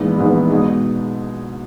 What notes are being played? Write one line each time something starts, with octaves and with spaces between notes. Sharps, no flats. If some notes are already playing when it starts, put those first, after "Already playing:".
Already playing: A#1 G#2 E3 G#3 B3
A#1 G#2 E3 G#3 B3
B2 G#3 D#4 G#4